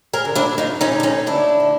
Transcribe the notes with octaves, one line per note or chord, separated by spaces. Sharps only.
G#4 A#4
D3
D4 E4
D2 D#4 F4
C#4 D#4
D3
D4
C#4 D#4
D2 D4 E4
D3